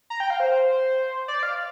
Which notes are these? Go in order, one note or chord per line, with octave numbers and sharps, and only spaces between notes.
A#5
G5
F5
C5
D5
F5